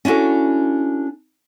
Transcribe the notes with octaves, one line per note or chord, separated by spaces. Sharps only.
C#4 D4 E4 F#4 A4